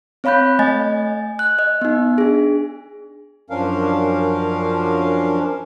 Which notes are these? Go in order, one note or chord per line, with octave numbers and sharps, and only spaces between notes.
C4 C#5 F5 B5 F#6 G6
A3 D#5 G#5 A6
F#6
D#5
B3 D#4
D4 G#4
F#2 F3 C#4 D4 A#4 F5